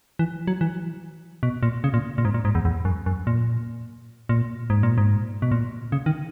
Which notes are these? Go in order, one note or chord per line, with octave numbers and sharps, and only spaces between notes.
E3
F#3
E3
B2
A#2
C#3
A#2
A#2
G#2
A#2
G#2
E2
E2
F#2
F#2
A#2
A#2
G#2
A#2
G#2
B2
A#2
C#3
D#3